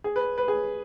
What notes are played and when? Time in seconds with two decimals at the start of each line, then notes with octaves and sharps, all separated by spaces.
0.04 G#4
0.16 B4
0.38 B4
0.48 G#4